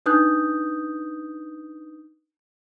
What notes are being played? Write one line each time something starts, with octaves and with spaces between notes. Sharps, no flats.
D4 D#4 B4 D#6 F#6 G6